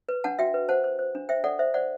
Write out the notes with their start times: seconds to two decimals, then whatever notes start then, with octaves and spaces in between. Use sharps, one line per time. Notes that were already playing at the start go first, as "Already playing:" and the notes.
0.09 B4
0.24 D4 F#5 A5
0.39 F#4 E5 G5
0.54 B4
0.69 C5 F#5 A5
0.84 C5
0.99 C5
1.15 D4
1.29 C5 E5 G5
1.44 A4 D5 F#5
1.59 C5 E5
1.74 C5 D5 F#5